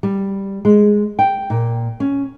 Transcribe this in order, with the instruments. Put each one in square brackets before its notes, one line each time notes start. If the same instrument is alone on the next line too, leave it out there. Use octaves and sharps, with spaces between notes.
[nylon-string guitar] G3
G#3
G5
A#2
C#4